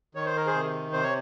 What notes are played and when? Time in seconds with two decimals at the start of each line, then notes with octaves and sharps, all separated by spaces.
0.15 D#3 C#5
0.26 C5
0.36 A#4
0.47 G#4 C5
0.54 C3
0.92 C3 C5
1.03 C#5